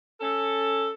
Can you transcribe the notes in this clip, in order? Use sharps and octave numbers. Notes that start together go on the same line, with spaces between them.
C#4 A4